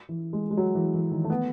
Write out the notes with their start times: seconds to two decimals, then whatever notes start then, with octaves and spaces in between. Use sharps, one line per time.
0.09 E3
0.33 G#3
0.51 G#3
0.57 F#3
0.75 E3
0.94 E3
1.12 D#3
1.24 A3
1.30 B3